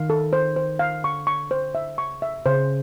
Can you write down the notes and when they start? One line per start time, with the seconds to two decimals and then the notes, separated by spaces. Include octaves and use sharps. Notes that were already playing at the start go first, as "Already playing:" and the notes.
Already playing: D#3 F5
0.10 A4
0.33 C5
0.56 C5
0.79 F5
1.04 D3 C#6
1.27 C#6
1.51 C5
1.75 E5
1.98 C#3 C#6
2.22 E5
2.35 C3
2.46 C#3 C5